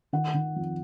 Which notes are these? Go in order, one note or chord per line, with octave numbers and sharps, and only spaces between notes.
D#3 F#5
D#3
F2